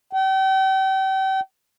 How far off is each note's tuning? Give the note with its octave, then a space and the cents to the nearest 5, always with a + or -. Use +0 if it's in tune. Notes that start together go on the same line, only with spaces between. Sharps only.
G5 -40